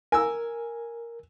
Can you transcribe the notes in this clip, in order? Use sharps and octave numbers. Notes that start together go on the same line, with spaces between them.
A#4 G#5 E6